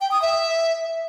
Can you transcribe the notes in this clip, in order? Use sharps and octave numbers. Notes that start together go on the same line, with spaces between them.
G5
D#6
E5